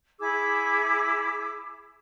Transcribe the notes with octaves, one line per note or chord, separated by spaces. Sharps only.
E4 G#4 D6 E6